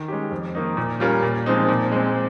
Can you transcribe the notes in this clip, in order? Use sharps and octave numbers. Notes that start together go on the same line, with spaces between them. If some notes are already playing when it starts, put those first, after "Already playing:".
Already playing: D#3
G#3 C#4 G4
F2
D#3 A#3 D#4
A#2
G3 C#4 F4 A#4
A#2
F3 G#3 C4 D#4
A#2
G#3 C4